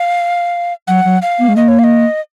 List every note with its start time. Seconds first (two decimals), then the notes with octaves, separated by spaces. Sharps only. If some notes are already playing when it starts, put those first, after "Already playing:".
Already playing: F5
0.88 F#3 F#5
1.05 F#3
1.22 F5
1.39 B3
1.48 G#3
1.56 A#3 D#5
1.68 C#5
1.79 F5
1.84 D#5